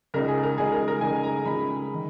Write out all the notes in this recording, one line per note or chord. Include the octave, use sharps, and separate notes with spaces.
C#2 C#3 G#3 D#4 A#4
G#4
A#4
C#2 C#3 G#3 D#4 G#4
A#4
A#4
C#2 C#3 G#3 D#4 G#5
A#5
C#2 C#3 G#3 D#4 B5
D#3